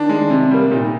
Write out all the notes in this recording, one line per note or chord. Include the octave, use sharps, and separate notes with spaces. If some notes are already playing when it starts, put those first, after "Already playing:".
Already playing: D#3 D4
G#3
C3
G3 A#3
A#2 D#4